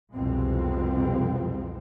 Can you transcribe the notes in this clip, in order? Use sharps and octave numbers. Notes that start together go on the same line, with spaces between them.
C2 F2 B2 G#3 C4